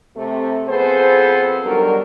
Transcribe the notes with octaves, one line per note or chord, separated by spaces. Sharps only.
C3 A3
F2 B3 G#4 A4 B4 C5
B2 D#3 F#3 G3 D4 A#4